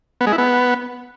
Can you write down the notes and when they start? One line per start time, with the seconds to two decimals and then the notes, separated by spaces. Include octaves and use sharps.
0.21 B3
0.26 G#3
0.32 E4
0.38 B3